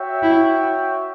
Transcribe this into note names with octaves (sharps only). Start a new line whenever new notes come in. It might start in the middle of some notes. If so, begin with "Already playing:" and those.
Already playing: F#4 C#5 E5 G5
E4